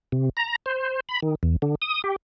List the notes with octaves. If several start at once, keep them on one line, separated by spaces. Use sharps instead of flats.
C3
A#5
C5
B5
D#3
E2
D3
D#6
G4